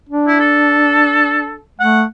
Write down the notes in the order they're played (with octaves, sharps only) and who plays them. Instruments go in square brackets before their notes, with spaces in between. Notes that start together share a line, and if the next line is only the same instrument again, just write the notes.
[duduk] D4
[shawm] E4
A4
[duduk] A3 [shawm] F#5